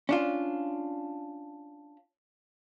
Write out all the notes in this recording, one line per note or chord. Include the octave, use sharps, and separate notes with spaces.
C#4 D4 F4